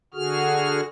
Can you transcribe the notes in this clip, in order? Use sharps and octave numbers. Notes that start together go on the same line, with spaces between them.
D3 F#4 G#4 F6